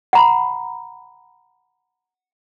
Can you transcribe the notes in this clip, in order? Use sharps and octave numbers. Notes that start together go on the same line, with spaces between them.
F#5 A#5 B5